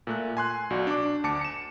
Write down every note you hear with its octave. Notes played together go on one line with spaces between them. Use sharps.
A#2 A3 F#6
G#5 C6 F#6
B1 F#4 D5
D4 D6
D2 A5 D6 C#7
C#7 E7